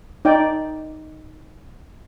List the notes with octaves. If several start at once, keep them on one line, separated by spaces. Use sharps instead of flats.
D#4 D5 G5